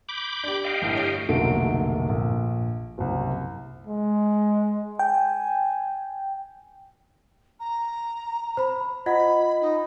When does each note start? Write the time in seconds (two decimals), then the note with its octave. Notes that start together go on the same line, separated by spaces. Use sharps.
0.09 B5 D6 G6
0.44 D4 G4
0.64 D#5 F5 G5
0.82 G1 A2
0.96 G4 C#5
1.29 F1 B1 D3 A3 A#3 D7
2.10 A#1
2.98 F#1 C2
3.87 G#3
4.99 G5 G#5
7.60 A#5
8.57 C5 B5
9.06 F4 D#5 F#5 B5
9.61 D#4